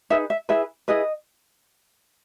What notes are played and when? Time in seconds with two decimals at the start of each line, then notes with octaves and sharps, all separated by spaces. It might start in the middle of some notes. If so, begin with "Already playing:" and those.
0.10 D#4 G#4 B4 E5
0.30 E5
0.49 E4 G#4 B4 E5
0.88 E4 G#4 B4 D#5